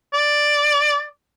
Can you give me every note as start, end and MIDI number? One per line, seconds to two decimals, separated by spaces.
0.14 1.04 74